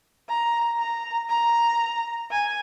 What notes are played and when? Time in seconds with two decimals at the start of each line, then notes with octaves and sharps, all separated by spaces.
0.29 A#5
0.79 A#5
1.30 A#5
2.31 G#5